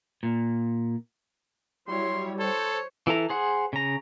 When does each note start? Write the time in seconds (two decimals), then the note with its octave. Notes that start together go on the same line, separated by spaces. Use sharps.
0.23 A#2
1.88 F#3 G3 E4 C#5 C6
2.39 A4 C5 C#5
3.07 E3 E4 A4 A#5
3.29 G#4 C5 F#5
3.73 C#3 A#5